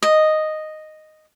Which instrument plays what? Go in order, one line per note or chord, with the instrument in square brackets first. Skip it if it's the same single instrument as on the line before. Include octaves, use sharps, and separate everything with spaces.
[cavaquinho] D#5